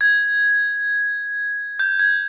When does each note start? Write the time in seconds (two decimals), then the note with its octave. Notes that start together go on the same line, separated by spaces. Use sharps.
0.01 G#6
1.79 G6
1.99 G#6